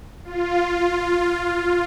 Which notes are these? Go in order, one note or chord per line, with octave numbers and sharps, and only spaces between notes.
F4